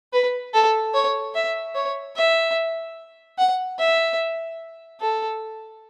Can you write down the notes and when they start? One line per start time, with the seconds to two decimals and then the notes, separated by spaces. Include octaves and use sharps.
0.13 B4
0.54 A4
0.94 C#5
1.34 E5
1.75 C#5
2.16 E5
3.38 F#5
3.79 E5
5.00 A4